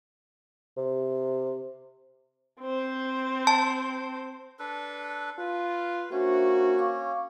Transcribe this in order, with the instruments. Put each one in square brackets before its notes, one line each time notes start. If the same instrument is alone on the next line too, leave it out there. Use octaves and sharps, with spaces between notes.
[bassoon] C3
[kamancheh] C4 C5
[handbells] A5
[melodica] D4 A4 B4
[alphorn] F4 [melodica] B4
[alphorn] A#3 [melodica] C#4 [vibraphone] D4 C5 E5 [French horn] F#4
[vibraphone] F5 C#6 D6